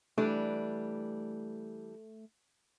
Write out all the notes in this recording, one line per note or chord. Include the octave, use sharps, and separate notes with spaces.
E3 G3 A3 D4